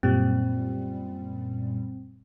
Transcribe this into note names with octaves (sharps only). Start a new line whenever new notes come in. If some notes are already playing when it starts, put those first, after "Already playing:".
F#2 A#2 G3 C4